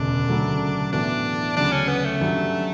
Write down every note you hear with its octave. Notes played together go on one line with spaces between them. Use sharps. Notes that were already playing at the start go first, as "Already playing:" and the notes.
Already playing: E1 D2 C#3 D4
D2 C#3 F#3 A3
A2 E3 B3 D4 F#4
D2 C#3 F#3 D4
C#4
B3
A3
G2 F#3 C#4